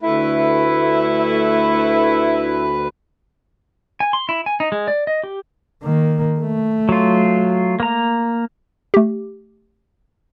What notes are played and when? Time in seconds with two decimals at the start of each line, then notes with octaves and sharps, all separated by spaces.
0.02 D2 A3 E4 B4
4.00 G#5
4.13 C6
4.29 E4
4.46 G#5
4.60 D#4
4.72 G#3
4.88 D5
5.07 D#5
5.23 G4
5.83 D#3 A#3
6.41 A3
6.89 F#3 F4
7.80 A#3 A#5
8.94 A3 G4